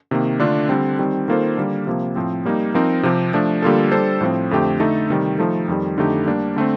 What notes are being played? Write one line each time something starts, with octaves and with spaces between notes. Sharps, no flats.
C3 D#3 A#3
D3 A3 D4 F4
D3 G3 C4
D#3 G3 C4
D#3 A#3 F4 A4 C5
D3 G3 A#3
C3 F3 A#3
A2 F3 C4
G3 A#3 D#4
F3 C4 D#4 A#4
C3 F3 C4 G4
F3 A3 D4
D3 G3 A#3 F4 A4
G3 D4 A4 C5
A2 F3 C4
F2 D3 A3 C4 G4
D3 A3 D#4 A4
C3 D#3 G3
F3 A3 D#4 A4
F2 D#3 G3
F2 D3 A3 D#4 G4
G3 A#3 D4
D3 A3 C4